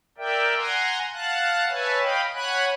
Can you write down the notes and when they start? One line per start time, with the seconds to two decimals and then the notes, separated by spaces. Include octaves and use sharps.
0.18 A#4 D5 E5 G5
0.56 F#5 G#5 A#5 C6
1.13 F5 F#5 A5 F#6
1.69 B4 C#5 E5 G#5 A5
2.01 D#5 F5 G5 B5
2.33 C#5 F#5 G#5 B5 F#6